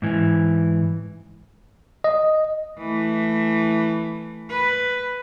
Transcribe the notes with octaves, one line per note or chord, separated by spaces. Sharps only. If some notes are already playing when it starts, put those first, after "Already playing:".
G#2 E3
D#5
E3 A3
B4